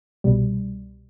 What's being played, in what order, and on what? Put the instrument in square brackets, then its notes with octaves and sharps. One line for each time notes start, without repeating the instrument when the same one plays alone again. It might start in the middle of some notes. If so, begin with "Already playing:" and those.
[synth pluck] C2 B2 G3